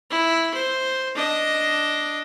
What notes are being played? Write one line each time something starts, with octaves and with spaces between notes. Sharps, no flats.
E4
C5
D4 D#5